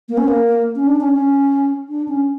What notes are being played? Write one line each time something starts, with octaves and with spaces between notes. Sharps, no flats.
A#3
C#4
A#3
C#4
D4
C#4
C#4
D4
C#4